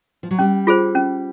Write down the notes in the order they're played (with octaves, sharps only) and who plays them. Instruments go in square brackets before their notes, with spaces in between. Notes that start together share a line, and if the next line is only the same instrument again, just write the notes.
[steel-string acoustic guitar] F3
F#3
[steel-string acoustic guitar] G3 [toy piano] C#4
[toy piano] F4 G#4 C5
C#4